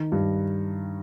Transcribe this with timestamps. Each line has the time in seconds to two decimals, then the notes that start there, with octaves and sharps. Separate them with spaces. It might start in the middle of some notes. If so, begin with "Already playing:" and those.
Already playing: D#3
0.12 G2